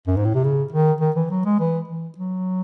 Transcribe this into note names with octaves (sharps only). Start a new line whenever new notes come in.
F#2
G#2
A2
C3
C#3
D#3
D#3
E3
F#3
G#3
E3
E3
F#3